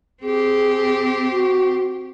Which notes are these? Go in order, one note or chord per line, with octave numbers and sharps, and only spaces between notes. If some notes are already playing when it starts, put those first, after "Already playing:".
C4 G4 G#4
F#4